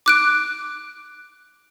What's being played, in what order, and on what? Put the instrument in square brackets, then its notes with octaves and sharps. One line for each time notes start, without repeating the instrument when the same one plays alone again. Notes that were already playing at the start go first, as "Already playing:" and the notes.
[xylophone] D6 F#6 D7